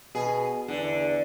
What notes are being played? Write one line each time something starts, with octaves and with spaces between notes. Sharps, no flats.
B2 G#4
E2 D3